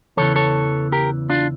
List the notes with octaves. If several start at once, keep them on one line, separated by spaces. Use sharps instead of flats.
E2 C#3 E3 A4 C#5
A4 C#5
G4 A#4
D4 F4